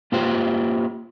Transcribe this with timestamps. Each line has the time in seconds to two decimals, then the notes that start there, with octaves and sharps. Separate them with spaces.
0.12 A#3 F4 G4 B4 C5